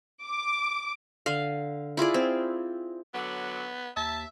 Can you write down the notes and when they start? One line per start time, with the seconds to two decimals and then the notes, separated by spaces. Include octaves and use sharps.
0.25 D6
1.26 D3 F5
1.97 E4 F4 G#4 D5
2.14 C4
3.14 D3 F#3 B3
3.97 D#2 E5 A5